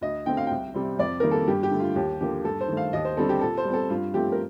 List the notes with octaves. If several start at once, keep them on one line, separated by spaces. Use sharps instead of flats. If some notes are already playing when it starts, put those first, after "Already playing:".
D2 D#5
D3 A3 C4 G5
F5
C2 G5
C3 G3 C4
F2 D5
D#3 G3 A#3 A#4
A4
G2 G4
G4
D3 A3
F4
D#2 G4
D3 F3 A#3 G4
G2 A4
C5
D#3 A3
F5
D#2 D#5
C5
D3 G3 C4 A4
G4
A#2 A4
C5
G3
C4 A4
G2 F4
F3 A3 C4 G4
A#4